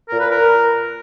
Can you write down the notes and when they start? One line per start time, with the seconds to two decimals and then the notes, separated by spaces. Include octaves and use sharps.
0.09 A#2 A#4
0.20 B4
0.30 A#4